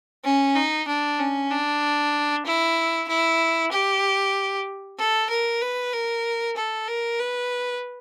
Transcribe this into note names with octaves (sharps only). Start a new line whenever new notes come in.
C#4
D#4
D4
C#4
D4
E4
E4
G4
A4
A#4
B4
A#4
A4
A#4
B4